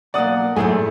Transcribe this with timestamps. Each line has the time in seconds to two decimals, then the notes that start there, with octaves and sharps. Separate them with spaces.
0.14 B1 A#3 D5 F#5 D#6
0.56 F#2 A2 A3 E4 G#4 G#5